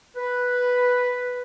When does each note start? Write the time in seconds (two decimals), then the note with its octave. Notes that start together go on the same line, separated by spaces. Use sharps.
0.16 B4